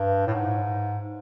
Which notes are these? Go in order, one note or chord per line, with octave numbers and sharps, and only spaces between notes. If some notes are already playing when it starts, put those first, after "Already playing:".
Already playing: G2
A2
G#2